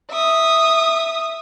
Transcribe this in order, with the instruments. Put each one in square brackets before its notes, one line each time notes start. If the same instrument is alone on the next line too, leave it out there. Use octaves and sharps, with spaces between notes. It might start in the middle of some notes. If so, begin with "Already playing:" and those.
[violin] E5 D#6